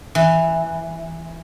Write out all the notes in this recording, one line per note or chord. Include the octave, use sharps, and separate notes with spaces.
E3